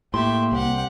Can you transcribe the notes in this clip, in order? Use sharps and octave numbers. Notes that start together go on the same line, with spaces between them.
A2 A#3 G4 E5 C6
C2 G4 F#5